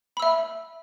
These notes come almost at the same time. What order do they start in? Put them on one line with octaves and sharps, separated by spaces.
B5 E6 E5